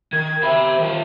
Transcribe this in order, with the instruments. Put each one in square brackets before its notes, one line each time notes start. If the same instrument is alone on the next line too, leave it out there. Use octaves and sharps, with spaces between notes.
[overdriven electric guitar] D#3 [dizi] G#6
[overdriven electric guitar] C5 E5 [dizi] B5
[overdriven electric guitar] D#3 F4